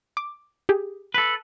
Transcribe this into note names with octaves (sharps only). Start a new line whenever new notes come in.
D6
G4 G#4
A4 B4